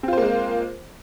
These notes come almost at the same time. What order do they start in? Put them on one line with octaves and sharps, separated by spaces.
C4 F4 C5 A#3 G#3